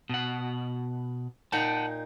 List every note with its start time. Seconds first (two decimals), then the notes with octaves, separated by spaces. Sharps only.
0.10 B2 F#5
1.52 A#2 D#4 F#5 G5 A5